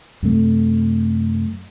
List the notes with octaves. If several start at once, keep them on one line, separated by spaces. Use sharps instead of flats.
F#2 C3 A3